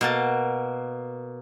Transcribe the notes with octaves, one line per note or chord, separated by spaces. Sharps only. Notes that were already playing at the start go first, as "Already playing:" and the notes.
B2 A#3 A5